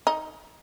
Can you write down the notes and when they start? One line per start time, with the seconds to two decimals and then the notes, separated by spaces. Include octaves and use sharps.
0.07 D#4